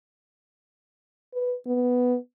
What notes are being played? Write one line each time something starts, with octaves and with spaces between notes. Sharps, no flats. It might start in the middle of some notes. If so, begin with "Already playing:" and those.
B4
B3